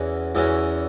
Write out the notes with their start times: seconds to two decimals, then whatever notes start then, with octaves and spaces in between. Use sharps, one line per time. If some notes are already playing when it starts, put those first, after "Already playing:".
Already playing: E2 E3 C#4 F#4
0.35 E2 E3 C#4 F#4